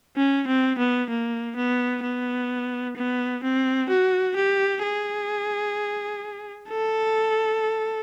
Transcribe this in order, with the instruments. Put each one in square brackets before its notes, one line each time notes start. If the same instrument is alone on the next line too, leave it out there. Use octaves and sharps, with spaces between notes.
[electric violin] C#4
C4
B3
A#3
B3
B3
B3
C4
F#4
G4
G#4
A4